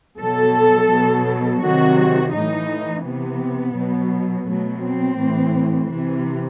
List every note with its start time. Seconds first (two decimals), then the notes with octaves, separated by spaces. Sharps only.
0.19 B2 F#3 A4
0.90 B2 F#3
1.61 C3 D#3 F#3 F#4
2.33 A2 E3 D#4
3.04 C3 E3 B3
3.75 B2 F#3
4.46 B2 F#3 A3
4.82 C4
5.18 A2 E3
5.89 C3 E3